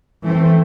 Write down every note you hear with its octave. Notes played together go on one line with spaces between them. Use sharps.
E3 A3 C4